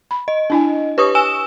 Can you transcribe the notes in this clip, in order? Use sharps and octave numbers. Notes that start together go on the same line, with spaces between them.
B5
D#5
D4 E4 G#5
G4 B4 C#5 C#6 D#6
G#5 E6 E7